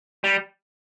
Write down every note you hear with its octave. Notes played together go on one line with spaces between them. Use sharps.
G3